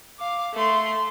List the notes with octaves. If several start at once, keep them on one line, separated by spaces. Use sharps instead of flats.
F5 D6
A3 C6